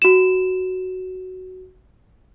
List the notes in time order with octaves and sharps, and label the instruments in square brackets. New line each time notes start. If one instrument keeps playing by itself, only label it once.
[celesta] F#4 E7